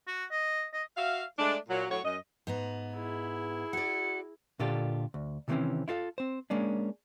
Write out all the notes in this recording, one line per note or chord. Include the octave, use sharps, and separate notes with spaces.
F#4
D#5
D#5
F#4 E5 F5
G#3 A3 D4
A#2 F#3
A2 F#3 F#4 C#5
F#2 D#5
G#2 B3 A#5
E4 G#4
F#4 D5 C#7
A#2 D3 F4 G4 A4
D2
C3 D#3 E3 A#3 C4 C#4
E4 F4 A4 F5
C4 C5
G#3 A#3 C#4 D4